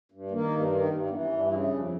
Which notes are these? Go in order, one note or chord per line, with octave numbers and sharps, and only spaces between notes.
G2
D#3 A#3
G2
D#3
G2
E3 B3
C#4
G2
D4
C#3 E4
F2
D4